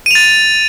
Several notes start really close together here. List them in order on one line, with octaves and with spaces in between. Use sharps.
D#7 F7 A6